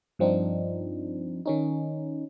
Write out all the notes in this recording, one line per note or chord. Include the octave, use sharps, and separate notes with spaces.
G2 F3 C4 D4 D#4
D#3 C#4 D#4